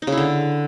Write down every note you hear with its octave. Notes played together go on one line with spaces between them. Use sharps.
D#4
C#3
E4
D3